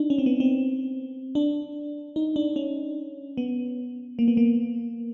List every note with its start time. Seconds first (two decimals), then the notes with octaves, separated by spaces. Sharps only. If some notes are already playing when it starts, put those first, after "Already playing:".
Already playing: D4 D#4
0.10 C#4
0.18 C4
0.26 B3
0.40 C4
1.35 D4
2.16 D#4
2.36 D4
2.56 C#4
3.37 B3
4.19 A#3
4.28 B3
4.37 A#3